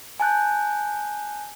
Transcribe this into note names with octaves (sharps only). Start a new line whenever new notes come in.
G#5 A5 F#6 G6